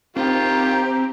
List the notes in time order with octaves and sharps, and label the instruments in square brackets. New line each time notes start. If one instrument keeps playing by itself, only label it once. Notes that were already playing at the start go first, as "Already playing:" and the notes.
[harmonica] D#3 F4 [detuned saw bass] C4 [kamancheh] G4 [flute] A#5